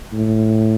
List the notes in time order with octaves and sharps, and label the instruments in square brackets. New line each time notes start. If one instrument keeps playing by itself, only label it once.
[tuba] A2